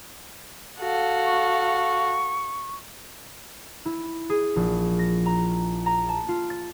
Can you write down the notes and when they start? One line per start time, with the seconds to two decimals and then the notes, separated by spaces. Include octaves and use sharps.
0.78 F#4 A4 F5
1.24 C#6
3.85 E4
4.29 G#4
4.56 A#1
4.99 A#6
5.26 A#5
5.86 A#5
6.09 A5
6.29 F4
6.50 A6